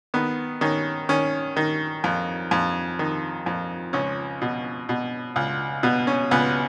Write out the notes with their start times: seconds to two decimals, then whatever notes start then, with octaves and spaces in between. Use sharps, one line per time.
0.14 D#3 B3
0.61 D#3 C#4
1.09 D#3 C#4
1.56 D#3
2.04 F2
2.51 F2
2.99 D#3
3.46 F2
3.93 C#2 C#4
4.41 B2
4.89 B2
5.36 C#2
5.83 B2 B3
6.07 C#4
6.31 C#2 B3